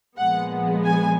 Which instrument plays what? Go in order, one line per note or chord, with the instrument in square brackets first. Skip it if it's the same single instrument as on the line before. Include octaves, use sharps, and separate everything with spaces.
[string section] A#2 F3 G#3 B3 F#5
G#5